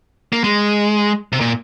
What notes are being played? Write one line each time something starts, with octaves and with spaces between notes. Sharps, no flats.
A#3
G#3
C3
A#2